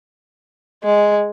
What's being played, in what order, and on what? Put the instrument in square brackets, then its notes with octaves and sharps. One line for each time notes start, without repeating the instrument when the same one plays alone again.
[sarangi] G#3